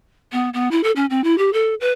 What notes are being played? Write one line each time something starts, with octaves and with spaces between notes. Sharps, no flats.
B3
B3
E4
A4
C#4
C4
E4
G4
A4
B4